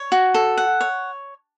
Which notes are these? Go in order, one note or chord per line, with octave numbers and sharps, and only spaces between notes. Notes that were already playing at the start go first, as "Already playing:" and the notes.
Already playing: C#5
F#4
A4
F#5
C#5